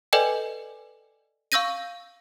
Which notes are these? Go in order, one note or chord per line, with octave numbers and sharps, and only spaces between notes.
A4 B4 D5 D#5 G5 G#5
F5 C#6 E6 G6 A#6 D#7